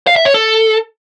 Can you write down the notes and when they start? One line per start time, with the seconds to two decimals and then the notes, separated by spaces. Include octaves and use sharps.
0.07 F5
0.16 E5
0.25 C#5
0.34 A4